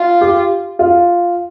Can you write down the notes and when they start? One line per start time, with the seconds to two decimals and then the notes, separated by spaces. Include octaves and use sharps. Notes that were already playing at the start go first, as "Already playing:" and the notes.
Already playing: F4
0.21 G4
0.79 F4